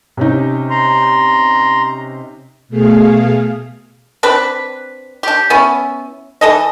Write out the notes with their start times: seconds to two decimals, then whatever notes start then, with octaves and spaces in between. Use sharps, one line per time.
0.17 C3 C#4 D#4
0.70 A#5 C6
2.69 B2 A3 G#4 F5
4.23 C4 D4 B4
5.23 D4 G4
5.50 B3 C#4 E4
6.41 E3 A4 D#5